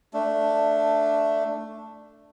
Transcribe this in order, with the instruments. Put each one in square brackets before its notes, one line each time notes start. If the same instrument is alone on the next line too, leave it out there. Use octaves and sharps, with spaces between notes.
[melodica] A3 D4